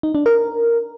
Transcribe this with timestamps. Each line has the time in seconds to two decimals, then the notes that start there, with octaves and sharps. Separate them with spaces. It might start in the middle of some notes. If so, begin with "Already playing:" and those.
0.03 D#4
0.15 D4
0.26 A#4